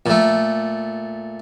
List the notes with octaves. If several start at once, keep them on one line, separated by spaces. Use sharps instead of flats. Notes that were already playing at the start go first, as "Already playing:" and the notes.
A#2 A3